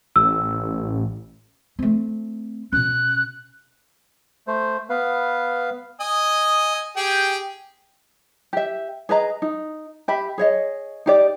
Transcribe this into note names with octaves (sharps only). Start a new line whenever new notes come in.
A1 E6
A3 C4
B2 C#4 F#6
A3 C5
B3 B4 F5
D#5 G#5 D#6
G4 G#4 G5
G4 E5
G#4 B4 D#5 A#5
D#4
G4 E5 B5
G#4 C#5 D#5
D#4 G4 D5